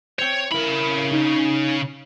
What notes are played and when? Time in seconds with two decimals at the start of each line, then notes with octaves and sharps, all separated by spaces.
0.19 C5 C#5 G5
0.51 C#3 E4 A#4 B5
1.12 D#4